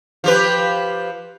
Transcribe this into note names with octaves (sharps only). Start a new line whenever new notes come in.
F3 G4 B4